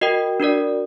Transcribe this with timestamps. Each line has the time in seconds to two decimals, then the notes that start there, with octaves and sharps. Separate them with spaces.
0.01 F#4 A#4 D#5 G5
0.40 D4 F#4 A#4 D5